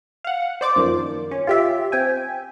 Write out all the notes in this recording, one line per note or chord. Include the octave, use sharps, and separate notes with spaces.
F5 F#5
C5 D5 D6
F#2 D#3 F3 A#3
C#4
F4 G4 E5
C4 G5 G#5